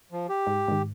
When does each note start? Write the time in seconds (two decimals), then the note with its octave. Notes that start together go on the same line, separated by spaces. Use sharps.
0.12 F3
0.29 G4
0.47 G#2
0.68 G#2 D#3